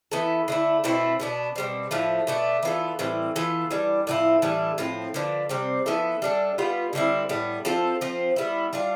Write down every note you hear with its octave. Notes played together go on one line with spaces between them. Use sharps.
E3 B3 E4 A4
D3 A3 E4
B2 A3 C4 E4
B2 B3 D4
B2 G3 C4
A2 F3 A3
B2 A3 D4
E3 B3 F4 A4
A2 E3 G3 C4
E3 B3 F4 A4
E3 G3 D4
A2 F3 C4 E4
A2 E3 G3 D4
A2 F3 C4
D3 F3 B3 D4
C3 G3 C4
F3 B3 E4 A4
G3 D4 A4
G3 B3 F4
D3 G3 C4 E4
A2 G3 B3
F3 C4 F4 A4
F3 C4 F4
G3 B3 E4
G3 D4 F4